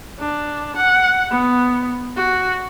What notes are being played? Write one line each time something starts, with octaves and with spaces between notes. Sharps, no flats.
D4
F#5
B3
F#4